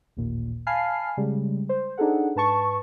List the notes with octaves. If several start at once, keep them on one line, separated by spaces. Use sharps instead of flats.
A1 D#2 A#2
F5 G#5 A5 B5 F6 C7
C#3 G3 G#3
C5
D4 D#4 G#4 A4 F#5
G#2 B4 A5 C#6